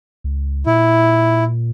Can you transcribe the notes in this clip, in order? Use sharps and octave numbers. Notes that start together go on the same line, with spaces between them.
C#2
A#2 E4